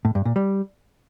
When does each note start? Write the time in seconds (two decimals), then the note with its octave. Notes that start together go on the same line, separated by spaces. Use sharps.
0.05 A2
0.15 G2
0.25 A#2
0.36 G3